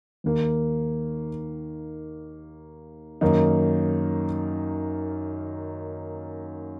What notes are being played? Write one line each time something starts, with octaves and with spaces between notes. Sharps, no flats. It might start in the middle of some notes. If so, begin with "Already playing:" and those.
D#2 D#3 A#3
F#2 D#3 A#3 D#4